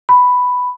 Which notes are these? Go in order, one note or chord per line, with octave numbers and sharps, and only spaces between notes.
B5